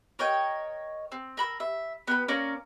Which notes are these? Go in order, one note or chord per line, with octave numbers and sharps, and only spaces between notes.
A#4 C#5 D#5 G5
C4
A#4 B5 E6
E5
B3 G5 B5
A#3 C#4 A#4 D5